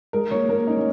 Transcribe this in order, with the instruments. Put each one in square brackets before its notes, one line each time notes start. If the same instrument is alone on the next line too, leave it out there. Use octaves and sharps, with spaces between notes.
[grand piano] G#3 [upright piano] A#4
[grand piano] A#3 [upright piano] C#5
[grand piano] A#3 [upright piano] A#4
[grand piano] C#4 [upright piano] D#4
[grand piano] A#3